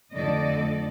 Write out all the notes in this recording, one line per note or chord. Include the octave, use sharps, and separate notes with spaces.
F2 D3 A3 A4 D5 D#5